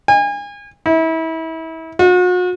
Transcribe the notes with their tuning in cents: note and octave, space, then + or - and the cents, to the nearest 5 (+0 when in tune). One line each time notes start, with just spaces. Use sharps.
G#5 -35
E4 -30
F#4 -40